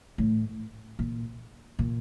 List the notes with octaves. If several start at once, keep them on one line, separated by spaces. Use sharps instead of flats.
A2
A#2
A#2